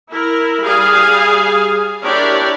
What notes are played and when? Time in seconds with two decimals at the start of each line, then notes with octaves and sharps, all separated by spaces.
0.10 E4 A#4
0.63 G3 G#4 F5
2.03 D4 E4 G4 A#4 C#5 D5